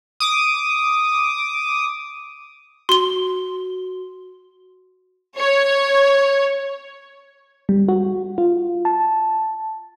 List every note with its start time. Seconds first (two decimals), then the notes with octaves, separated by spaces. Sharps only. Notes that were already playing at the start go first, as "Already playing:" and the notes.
0.20 D6 D#6
2.89 F#4 C6 G7
5.39 C#5
7.69 G3
7.89 F#4
8.38 F4
8.85 A5